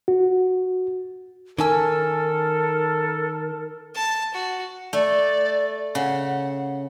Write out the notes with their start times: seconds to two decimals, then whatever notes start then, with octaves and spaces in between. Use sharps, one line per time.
0.08 F#4
1.59 D#3 C#4 D#4 A4 A#4 G#5 A5 E6
3.95 A5
4.34 F#4
4.93 A3 D5
5.95 C#3 F#5